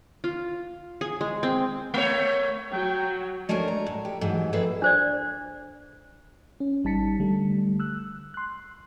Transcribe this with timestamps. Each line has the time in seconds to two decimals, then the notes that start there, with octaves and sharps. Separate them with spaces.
0.24 F4
1.01 G#4
1.21 G#3
1.43 C4
1.94 A3 C#5
2.72 F#3 G5
3.49 G#3 A3 D4 G#4 A#4 C#5
3.68 A#5
3.86 A2
4.05 G4
4.21 G#2 E3 F#3 G#3
4.53 F2 A#3 G#4 A4 B4 E5
4.82 D4 C5 D5
6.60 C#4
6.84 G#1 G3 D#4 A5 B6 C#7
7.19 D3 G3 A3
7.80 E6 F#6
8.34 C6 F#6